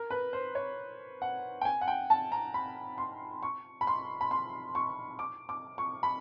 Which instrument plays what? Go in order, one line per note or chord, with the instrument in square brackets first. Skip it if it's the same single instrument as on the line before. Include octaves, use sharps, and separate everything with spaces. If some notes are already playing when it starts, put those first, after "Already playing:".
Already playing: [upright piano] A#4
B4
C5
C#5
F#5
G5
G#5
F#5
G5
A5
A#5
B5
C6
C#6
B5
C6
B5
C6
C#6
D6
D6
C#6
B5